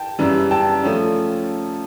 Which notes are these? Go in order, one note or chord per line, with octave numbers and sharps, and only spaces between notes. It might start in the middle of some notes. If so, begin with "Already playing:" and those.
Already playing: G5 A5
F#2 C#3 E3 G3
G5 A5
C#3 F3 A3 C#4